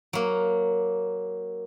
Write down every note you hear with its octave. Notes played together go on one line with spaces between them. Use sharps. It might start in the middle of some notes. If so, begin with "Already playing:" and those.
F#3 A#3